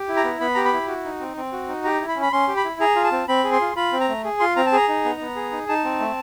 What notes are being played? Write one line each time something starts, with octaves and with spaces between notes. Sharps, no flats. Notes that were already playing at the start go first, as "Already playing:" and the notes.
Already playing: G4
E4
A#5
B3
B3 B5
G4 A#5
B5
E4
F#4
D#4
C4
C4
F#4
D#4
G4 A#5
E4
B5
C#4
B5
C#4 C6
G4
B5
E4
G#4 A#5
F4
A5
C4
C4 B5
G#4
C6
F4
F4 B5
C4
A#5
A3
G#4
F4 C6
C4 A#5
A5
G#4 A#5
D#4
B3
B3
G#4
D#4
D#4 A5
C4
A3